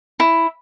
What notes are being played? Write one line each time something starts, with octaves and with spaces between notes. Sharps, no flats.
E4